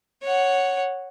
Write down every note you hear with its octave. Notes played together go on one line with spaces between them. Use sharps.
C#5 F#5